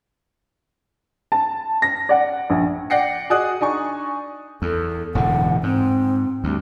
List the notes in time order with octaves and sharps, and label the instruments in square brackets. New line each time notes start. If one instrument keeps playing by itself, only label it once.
[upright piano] A5
A#6
D5 F#5
A#1
D5 F#5 G5 A#6 C7 C#7
F#4 G#4 D5 D#5 D#6 F#6
D4 D#4 G#5 C#6
[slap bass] E2 [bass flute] A4
[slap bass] E1 A2 D3 [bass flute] F#5
[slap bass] G#2 [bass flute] C4
[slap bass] D2 [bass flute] G3